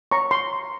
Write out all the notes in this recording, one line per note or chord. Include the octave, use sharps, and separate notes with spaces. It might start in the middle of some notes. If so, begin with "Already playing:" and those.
C#5 A#5 C#6
C6